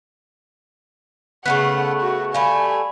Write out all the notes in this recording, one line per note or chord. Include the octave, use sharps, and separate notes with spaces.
C#3 A3 B3 F#5 F#6 B6
F#4
G3 A3 F5 G#5 B5